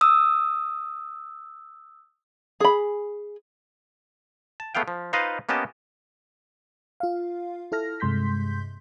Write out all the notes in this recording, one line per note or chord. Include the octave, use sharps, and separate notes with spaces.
D#6 E6
G#4 B5
A5
A3 B3 G#4 F5 G5
F3
D#4 F4 B4 C5 D#5 F5
A#3 B3 C#4 G4 D#5 A5
F4 F5
E4 A4 F6 A#6
G2 C3 G#3 C6 G6 B6